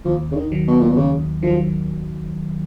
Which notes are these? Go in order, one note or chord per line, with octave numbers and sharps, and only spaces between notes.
D#2 F3
C#3
D#3
D#3 F#3
B2
A#2
B2
D#2 C#3
D#3 F3 F#3